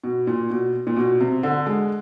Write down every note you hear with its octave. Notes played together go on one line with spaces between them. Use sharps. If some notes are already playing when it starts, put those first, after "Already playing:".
B2
A#2
B2
A#2
B2
C3
D3
G#3